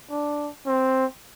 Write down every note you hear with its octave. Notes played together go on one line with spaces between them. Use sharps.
D4
C4